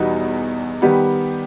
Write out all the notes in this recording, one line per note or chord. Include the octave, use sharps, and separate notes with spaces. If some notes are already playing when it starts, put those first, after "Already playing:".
Already playing: E2 B2 G3 B3 D#4
D#3 G3 B3 G4